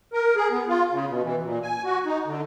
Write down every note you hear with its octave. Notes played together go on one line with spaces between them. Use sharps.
A#4
G#4
B3
F4
C#3
B2
E3
A#2
G#5
F#4
D#4
D3